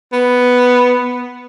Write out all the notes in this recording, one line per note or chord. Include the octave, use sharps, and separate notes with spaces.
B3